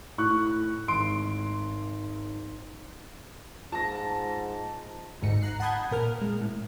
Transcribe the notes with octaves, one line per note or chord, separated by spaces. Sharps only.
A2 C#6 F#6
G#1 C6 D7
G#2 F4 A5 A#6
G#1 D2 G#2 D#4 C#7
A#5 F#6 C7
F#5 A5 B5 D#6 G6 G#6
A#2 A#4 F6
G#3
A2